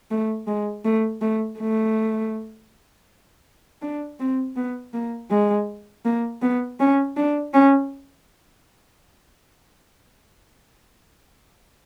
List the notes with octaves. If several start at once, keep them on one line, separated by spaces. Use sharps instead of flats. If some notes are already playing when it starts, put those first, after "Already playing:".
A3
G#3
A3
A3
A3
D4
C4
B3
A#3
G#3
A#3
B3
C#4
D4
C#4